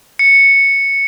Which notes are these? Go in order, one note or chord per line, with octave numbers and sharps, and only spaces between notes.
C#7